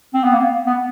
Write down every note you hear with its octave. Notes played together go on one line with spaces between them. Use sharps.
C4
B3
A#3
B3